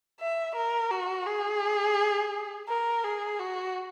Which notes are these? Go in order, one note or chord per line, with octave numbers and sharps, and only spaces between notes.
E5
A#4
F#4
G#4
A#4
G#4
F#4